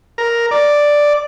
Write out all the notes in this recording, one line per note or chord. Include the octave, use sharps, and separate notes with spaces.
A#4
D5